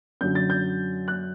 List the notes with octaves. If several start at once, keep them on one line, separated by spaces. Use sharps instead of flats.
F#2 D3 F#3 G6
A6
G6
F#6